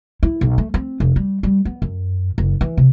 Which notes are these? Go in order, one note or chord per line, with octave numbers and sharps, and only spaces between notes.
E4
B1
A3
C4
F1
G3
G3
B3
F#2
F#1
E3
C3